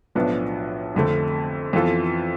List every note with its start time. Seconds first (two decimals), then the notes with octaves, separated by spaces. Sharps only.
0.15 B1 A2 F3 B3 D4
0.95 F1 F2 D3 A3
1.73 F2 E3 B3 F4 A4